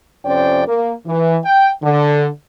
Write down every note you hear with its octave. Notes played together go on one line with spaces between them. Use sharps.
F2 C3 C#4 C5 D5 G5
A#3
E3
G5
D3